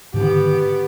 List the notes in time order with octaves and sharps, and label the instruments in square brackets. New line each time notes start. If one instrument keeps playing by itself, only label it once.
[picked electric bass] G#2 D3 D#3 [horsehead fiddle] B3 G4